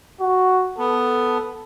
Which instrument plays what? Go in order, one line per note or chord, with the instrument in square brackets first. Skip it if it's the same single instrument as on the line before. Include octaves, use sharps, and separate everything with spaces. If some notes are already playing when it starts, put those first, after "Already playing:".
[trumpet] F#4
[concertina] B3 [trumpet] A4